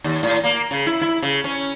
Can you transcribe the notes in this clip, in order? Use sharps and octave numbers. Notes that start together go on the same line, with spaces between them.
D#2
A2
A#3
C#3
E4
E4
C#3
C#4